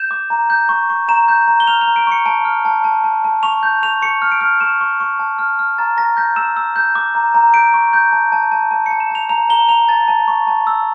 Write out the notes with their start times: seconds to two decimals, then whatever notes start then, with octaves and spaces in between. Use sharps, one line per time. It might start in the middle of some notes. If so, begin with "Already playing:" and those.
Already playing: G6 E7
0.11 D6
0.30 A#5
0.50 G6
0.69 C#6
0.90 C#6
1.08 A#5 E7
1.28 G6
1.48 A#5
1.60 G7
1.67 F6 F7
1.81 F7
1.87 A#5
1.96 D7
2.07 C#6 C#7
2.26 A5 D7
2.45 F6
2.65 A5
2.84 A5
3.04 A5
3.24 A5
3.43 C#6 F7
3.63 G6
3.82 C#6 F7
4.02 C#6 C#7
4.22 F6
4.32 D7
4.41 F6
4.61 C#6 E7
4.81 C#6
5.00 C#6
5.19 A5
5.38 F6
5.59 F6
5.78 A#5 A6
5.97 A#5 A#6
6.17 G6 A#6
6.36 E6 E7
6.57 E6
6.76 G6
6.95 D6
7.15 A#5
7.35 A#5
7.53 G6 D7
7.74 C#6
7.93 G6
8.12 A5
8.32 A5
8.51 A5
8.71 A5
8.86 A5 C#7
9.00 E7
9.10 A5 F7
9.29 A#5 F7
9.50 A#5 G7
9.69 A#5 F7
9.89 A5 A6
10.08 A5
10.28 C#6
10.47 A5
10.67 E6